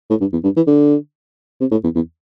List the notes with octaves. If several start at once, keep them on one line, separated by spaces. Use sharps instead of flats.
A2
G2
E2
G2
E3
D3
C3
A2
E2
E2